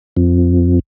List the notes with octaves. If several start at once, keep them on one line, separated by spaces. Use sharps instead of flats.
F2